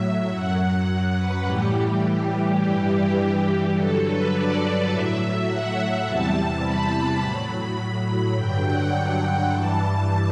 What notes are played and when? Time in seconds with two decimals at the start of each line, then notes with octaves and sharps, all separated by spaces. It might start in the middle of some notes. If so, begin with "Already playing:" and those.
Already playing: A2 F#3 E5
0.30 F#2 F#3 F#5
1.16 B4
1.45 A2 E3 G3 G4
2.60 G2 E3 G3 G4
3.17 G4
3.75 G2 D3 F#3 A4
4.04 B4
4.33 D5
4.90 A2 F#3 E5
5.47 F#5
6.05 E2 C3 E3 G3 A5
6.63 B5
7.20 A2 F#3
8.35 G2 D3 F#3 G5
8.64 F#5
9.21 F#5
9.50 G2 E3 G3 A5
9.79 A5